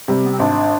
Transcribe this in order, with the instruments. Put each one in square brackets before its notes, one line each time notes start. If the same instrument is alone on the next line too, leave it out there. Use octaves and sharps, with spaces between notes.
[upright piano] C3 G3
[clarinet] B3
C4
[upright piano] G#1 [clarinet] D4